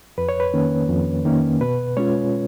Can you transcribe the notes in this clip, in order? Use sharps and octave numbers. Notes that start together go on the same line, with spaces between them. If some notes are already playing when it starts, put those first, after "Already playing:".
F2 B4
C#5
B4
D#3 A#3 C#4
F2
D#3 A#3 C#4
B2 B4
G#3 C#4 F4 C#5